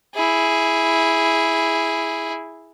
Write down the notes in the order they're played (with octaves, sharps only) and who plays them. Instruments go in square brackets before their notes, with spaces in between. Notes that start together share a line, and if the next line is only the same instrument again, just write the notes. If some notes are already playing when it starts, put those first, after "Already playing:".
[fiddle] E4 G#4